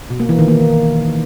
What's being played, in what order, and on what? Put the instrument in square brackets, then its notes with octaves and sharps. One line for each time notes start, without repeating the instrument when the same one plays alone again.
[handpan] B2
A#3
E3
D#3
A#3